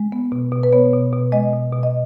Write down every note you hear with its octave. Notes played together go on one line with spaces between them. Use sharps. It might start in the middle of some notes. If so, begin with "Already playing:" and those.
Already playing: G#3
B3
B2
B2
B4
B3 C#5
B2
B2
G#3 D#5
B2
B2
D#5